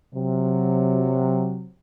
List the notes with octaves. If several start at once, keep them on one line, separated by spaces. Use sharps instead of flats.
C3 F#3